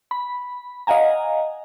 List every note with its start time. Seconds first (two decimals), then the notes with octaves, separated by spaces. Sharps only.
0.11 B5
0.87 D#5 F5 F#5 G#5 A#5